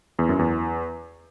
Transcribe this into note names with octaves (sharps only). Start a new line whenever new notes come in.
E2
F#2
E2